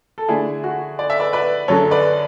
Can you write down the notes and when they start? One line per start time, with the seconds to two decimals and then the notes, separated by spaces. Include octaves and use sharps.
0.18 A4
0.28 D3 A3 D4 E4 G#4
0.64 F#4
0.99 D5
1.10 E5
1.20 B4 D5
1.33 B4 D5
1.68 F#2 D3 F#3 A4 C#5
1.91 B4 D5